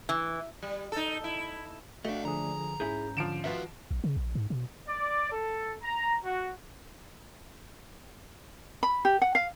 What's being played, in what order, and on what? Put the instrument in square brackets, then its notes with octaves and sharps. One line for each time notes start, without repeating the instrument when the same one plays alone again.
[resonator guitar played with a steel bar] E3
[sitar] G3
D#4 A4
E4
[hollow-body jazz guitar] A3 D4 [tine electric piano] F#4 [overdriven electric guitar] D#5 F5
[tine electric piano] D3 F3 G#4 [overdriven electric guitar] A#5
[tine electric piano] G#2 C#4 G6 [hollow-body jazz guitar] E4 G#4
[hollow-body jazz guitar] D3 [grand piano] F3 D7 E7
[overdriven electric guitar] D#3 F#4 [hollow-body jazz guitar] F4 B4 E5
[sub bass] A#1
C#3
A#1
G#2
B2
[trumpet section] D5
A4
A#5
F#4
[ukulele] B5
G4
F#5
F5